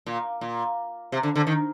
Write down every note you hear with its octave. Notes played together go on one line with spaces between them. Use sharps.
A#2
A#2
C3
D3
D3
D#3